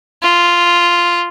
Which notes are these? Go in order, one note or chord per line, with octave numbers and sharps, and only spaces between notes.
F4